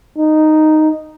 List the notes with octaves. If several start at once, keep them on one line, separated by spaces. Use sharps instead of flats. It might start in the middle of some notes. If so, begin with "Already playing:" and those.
D#4